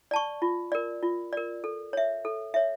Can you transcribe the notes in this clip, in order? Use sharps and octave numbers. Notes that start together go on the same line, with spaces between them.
D5 A5 C#6
F4
A#4 D5
F4
A#4 D5
A4
C#5 E5
A4
C#5 E5